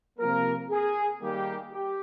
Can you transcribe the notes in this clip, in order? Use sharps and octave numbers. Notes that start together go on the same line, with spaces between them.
C3 F3 A#3 A#4
G#4
D#3 G3 A#3 G4
G4